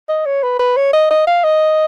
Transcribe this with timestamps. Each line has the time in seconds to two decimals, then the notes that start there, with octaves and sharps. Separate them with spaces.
0.09 D#5
0.26 C#5
0.43 B4
0.59 B4
0.77 C#5
0.93 D#5
1.10 D#5
1.27 F5
1.44 D#5